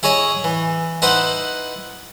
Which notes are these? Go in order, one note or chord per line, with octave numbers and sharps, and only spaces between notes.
E4 G#4 C#5 D#5 E5
E3
D#4 E4 B4 C5 F#5